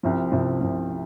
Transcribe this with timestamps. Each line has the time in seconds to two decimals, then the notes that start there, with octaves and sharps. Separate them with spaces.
0.03 C2 C3 F3
0.32 C2 C3 F3
0.61 C2 C3 F3
0.90 C3